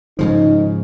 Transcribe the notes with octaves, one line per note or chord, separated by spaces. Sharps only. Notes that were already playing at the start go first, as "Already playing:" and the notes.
G#2 C#3 F3 D#4